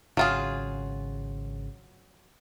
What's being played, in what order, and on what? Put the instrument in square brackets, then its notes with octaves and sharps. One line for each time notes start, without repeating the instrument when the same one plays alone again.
[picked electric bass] G#1 C#3 [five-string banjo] F#3 F4 G#4